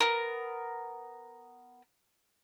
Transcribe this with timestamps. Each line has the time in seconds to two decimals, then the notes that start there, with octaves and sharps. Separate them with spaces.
0.01 B3 A#4